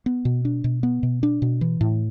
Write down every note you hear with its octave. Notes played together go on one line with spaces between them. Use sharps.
B3
B2
D4
B2
B3
B2
D4
B2
E3
A2